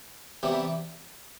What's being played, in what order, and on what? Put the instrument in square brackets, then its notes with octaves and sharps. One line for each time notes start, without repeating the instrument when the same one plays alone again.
[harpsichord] C3 E3 G3 B3